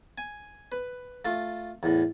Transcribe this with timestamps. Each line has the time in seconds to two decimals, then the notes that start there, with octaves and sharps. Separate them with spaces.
0.18 G#5
0.72 B4
1.25 A3 F4
1.83 E2 A2